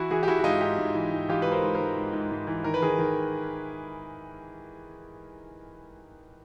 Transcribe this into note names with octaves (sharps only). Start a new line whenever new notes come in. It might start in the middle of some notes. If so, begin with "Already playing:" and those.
Already playing: E3 E4 F#4
E3 F#4 G#4
G4
E3 E4 F#4
F#4
G#2 D#4 F4
G#2 F4 G4
G#2
E3
G#2
E3 F4 G4
G#2 B4
A#4 C5
G#2
A#4 C5
G#2
G#2
G#2
G#2
E3
D#3 A#4
B4
D#3 G#4 A#4
D#3